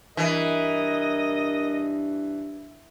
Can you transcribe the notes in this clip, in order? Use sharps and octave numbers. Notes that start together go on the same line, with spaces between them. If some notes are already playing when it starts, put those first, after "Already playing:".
G2 E3 A#4 D#5